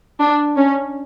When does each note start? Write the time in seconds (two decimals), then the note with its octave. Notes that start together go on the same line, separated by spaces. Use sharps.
0.20 D4
0.57 C#4